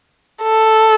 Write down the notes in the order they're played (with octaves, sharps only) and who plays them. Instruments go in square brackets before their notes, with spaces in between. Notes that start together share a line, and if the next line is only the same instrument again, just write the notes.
[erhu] A4